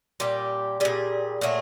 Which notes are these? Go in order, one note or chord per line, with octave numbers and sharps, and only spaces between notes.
A#2 G3 G4
A#2 G3 G#4
A#2 F#3 A3 G#4